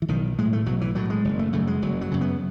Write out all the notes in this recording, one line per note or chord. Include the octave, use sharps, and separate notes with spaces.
E3
B1 D#3
A2 G#3
A3
B1 F#3
E3
A2 F#3
G#3
F#1
A3
F#2 C#3 A3
G#3
F#1 F#3
F#3
F#2 C#3
B3